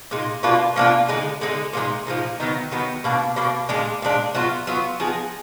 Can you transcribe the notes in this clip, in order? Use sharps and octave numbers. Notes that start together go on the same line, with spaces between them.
A#2 G#3 D#4
B2 A#3 D4 F4
B2 A#3 D4 F4
D3 G#3 D#4 G#4
D3 G#3 D#4 G#4
A#2 F3 G#3 D#4
A#2 F3 G#3 D#4
D#3 F#3 B3 D#4
D#3 F#3 B3 D#4
B2 A#3 D4
B2 A#3 D4
A#2 G#3 D4
A#2 G#3 D4
F#3 B3 F4
F#3 B3 F4
F3 B3 D#4 G#4